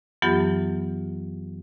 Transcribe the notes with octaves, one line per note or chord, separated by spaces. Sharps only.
F#2 E3 F#3 B3 F4 G4